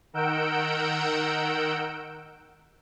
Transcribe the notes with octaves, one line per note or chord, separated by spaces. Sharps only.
D#3 A#4 F#5 E6 G6 D7